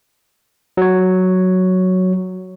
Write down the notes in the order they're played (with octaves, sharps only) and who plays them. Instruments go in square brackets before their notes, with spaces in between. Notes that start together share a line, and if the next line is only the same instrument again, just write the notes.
[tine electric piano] F#3 C#5